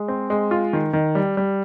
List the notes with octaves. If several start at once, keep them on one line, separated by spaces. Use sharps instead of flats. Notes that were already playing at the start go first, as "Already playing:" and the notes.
Already playing: G#3
C4
G#3
F4
D#3
D#3
G3
G3